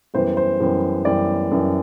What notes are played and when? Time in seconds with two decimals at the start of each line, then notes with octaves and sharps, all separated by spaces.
0.14 F#2 E3 G3 B3 C5
0.37 C5
0.60 F#2 E3 G3 B3
1.05 F#2 E3 G3 B3 D5
1.51 F#2 E3 G3 B3